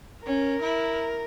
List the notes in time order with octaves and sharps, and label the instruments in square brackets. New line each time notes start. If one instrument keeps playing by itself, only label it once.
[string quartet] C#4 [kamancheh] A#4
[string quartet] E4